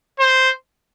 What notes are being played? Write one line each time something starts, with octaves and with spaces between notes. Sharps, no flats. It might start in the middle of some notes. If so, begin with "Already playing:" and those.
C5